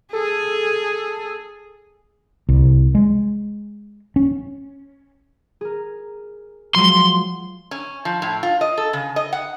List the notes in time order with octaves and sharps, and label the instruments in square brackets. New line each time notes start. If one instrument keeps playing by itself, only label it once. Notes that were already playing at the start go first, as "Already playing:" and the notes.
[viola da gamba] G#4 [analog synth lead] A4
[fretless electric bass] C2
G#3
C#4
[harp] G#4 A#4
[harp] F3 F#3 G#3 [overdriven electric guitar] C6
[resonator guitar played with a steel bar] C#4
F3
A2
F4
D#5
A4
C#3
D#5
F#5